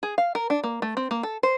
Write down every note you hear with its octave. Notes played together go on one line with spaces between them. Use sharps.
G#4
F5
A#4
D4
A#3
A3
C4
A#3
A4
C5